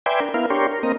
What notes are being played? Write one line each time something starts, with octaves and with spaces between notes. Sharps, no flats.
B4 D5 E5 G5 G#5 C6
D4 A#4
B3 E4 A#4 F5
D4 G4 A#4 C#5 C6
A#4
A#3 C4 A#4 D#5